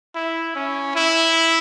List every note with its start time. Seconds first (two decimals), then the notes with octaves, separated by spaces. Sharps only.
0.16 E4
0.56 C#4
0.95 E4